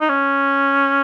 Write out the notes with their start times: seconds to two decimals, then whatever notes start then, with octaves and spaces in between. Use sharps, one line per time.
0.01 D#4
0.10 C#4